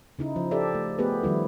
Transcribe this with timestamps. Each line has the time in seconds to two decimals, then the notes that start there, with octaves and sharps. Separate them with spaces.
0.19 C#3 D#4 E4
0.36 F3
0.51 G4 A4 D5 E5
0.74 A3
0.99 A3 B3 G4 G#4 B4
1.23 D#3 F3 G3 E4